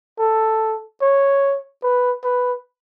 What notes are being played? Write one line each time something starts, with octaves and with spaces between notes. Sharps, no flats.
A4
C#5
B4
B4